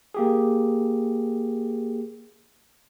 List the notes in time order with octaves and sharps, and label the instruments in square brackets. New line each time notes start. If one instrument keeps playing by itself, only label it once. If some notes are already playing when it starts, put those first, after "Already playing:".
[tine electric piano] A#3 G4 G#4